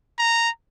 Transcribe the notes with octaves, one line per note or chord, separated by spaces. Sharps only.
A#5